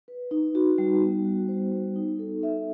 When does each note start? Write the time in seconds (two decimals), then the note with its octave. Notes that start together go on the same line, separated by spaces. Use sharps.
0.08 B4
0.31 D#4
0.55 F#4
0.78 G3
1.02 B3
1.25 F#4
1.48 C5
1.72 B3
1.96 D#4
2.19 A4
2.43 E5